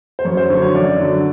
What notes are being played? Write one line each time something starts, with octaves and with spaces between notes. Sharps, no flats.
C5
F#2 C#5
C5
D3 C#5
F#3
C#5
F#2 D5
D3 F#3